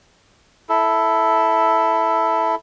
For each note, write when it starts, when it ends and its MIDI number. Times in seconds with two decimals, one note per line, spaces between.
0.69 2.55 64
0.69 2.55 69